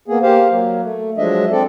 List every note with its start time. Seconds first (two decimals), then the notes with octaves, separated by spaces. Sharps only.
0.08 A#3 B3 G#4
0.22 A#3 G4 C5 F5
0.51 F#3 A#3
0.82 A3
1.18 F3 F#3 G#3 D4 D#5 E5
1.51 C4 A4 D5